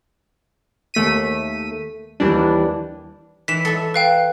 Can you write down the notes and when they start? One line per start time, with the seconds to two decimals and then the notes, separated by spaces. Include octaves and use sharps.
0.94 D#2 A3 B6 D#7
2.20 D#2 E3 G3 D4
3.48 E3 B6 E7
3.65 A4 E5
3.94 B4 F5 G5